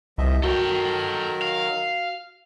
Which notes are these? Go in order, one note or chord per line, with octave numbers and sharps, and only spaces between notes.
C2 F3 D#5 E5
D#3 F#3 F#4 A4 A#4 G5
F5